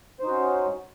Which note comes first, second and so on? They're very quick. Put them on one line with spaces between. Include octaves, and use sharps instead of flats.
C5 D#4 F#4 C#4